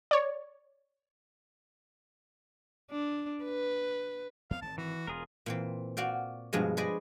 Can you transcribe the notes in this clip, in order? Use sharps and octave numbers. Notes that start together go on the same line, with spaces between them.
C#5 D5
D4
B4
F2 A#3 B3 F5
G#1 A5
E3 F#4
E1 F4 G#4 A#4
A#2 E3 C4
F#4 D5 F5 G5
G2 B2 F3 G#3
G#4 B4 C5 D5 D#5 G#5